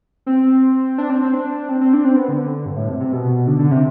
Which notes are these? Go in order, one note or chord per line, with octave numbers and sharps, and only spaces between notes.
C4
D4
C4
C4
D4
C4
C4
D4
C4
B3
D3
G2
A2
C3
C3
B2
D3
D3
C3